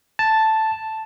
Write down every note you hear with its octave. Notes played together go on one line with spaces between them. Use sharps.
A5